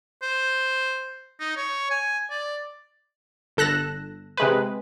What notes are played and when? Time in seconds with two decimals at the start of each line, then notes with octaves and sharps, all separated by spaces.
0.22 C5
1.40 D#4
1.57 C#5
1.91 G#5
2.31 D5
3.57 G1 A4 F#6 A#6 E7
4.37 C3 G#3 B4